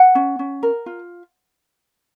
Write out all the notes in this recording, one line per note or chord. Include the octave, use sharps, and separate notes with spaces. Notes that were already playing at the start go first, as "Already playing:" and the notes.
Already playing: F#5
C#4
C#4
A#4
F4